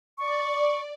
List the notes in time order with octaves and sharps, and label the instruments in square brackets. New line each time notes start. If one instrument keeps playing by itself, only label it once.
[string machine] D5 [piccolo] C#6